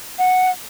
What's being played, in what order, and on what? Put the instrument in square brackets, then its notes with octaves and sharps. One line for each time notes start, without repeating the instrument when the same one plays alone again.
[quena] F#5